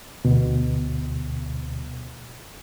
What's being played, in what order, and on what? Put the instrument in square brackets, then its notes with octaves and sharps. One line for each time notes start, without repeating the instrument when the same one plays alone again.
[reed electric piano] D2 B2